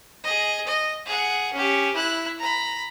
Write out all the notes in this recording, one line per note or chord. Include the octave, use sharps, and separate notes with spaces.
G#4 D#5
D#5
G#4 F#5
C#4 G4
E4 F#6
A#5 B5